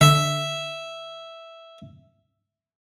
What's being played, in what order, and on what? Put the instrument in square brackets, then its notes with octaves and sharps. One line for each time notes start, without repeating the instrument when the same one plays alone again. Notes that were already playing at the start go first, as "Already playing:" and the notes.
[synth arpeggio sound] D3 [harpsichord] E5